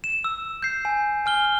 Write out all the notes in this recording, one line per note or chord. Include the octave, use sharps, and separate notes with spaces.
E7
E6
G6 C7
G#5
G#5 F6 G7